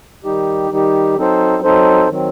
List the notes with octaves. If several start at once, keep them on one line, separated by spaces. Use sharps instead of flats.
D#3 G3 D#4 G4
D#3 G3 D#4 G4
F#3 C4 D#4 A4 C5
F#3 C4 D#4 A4 C5
D#3 F#3 C4